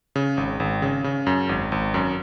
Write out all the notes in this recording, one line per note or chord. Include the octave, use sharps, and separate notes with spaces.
C#3
G#1
G#1
C#3
C#3
F#2
G#1
G#1
F#2